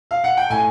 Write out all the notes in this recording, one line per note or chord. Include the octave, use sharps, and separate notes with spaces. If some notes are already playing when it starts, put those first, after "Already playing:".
F5
F#5
G5
A2 G#5